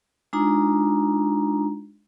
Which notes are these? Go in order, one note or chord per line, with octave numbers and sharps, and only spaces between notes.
G#3 D4 D#4 F4 A#5